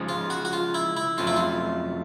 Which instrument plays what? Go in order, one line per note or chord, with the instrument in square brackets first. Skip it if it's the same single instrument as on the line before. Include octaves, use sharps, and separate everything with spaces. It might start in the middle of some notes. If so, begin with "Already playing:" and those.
Already playing: [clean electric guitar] C#3 F3 G#3
[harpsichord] F4
F#4
F#4
F4
E4
E4
[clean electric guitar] F2 C#3 F#3 A3 [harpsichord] F4
[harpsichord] E4
F4